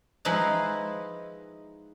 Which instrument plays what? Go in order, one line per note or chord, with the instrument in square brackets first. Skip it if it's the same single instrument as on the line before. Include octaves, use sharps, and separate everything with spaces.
[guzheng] F3 G#3 D#4 E4 B4